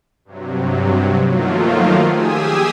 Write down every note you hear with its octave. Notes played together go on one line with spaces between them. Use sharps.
G2 C3 F#3
D#3 F3 F#3 A3 A#3 F4
G4 G#4 G#5 D#6 E6